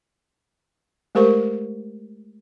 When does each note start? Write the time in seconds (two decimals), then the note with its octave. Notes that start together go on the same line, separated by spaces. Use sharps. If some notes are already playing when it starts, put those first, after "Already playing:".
1.15 G#3 A3 G4 A#4 C5 C#6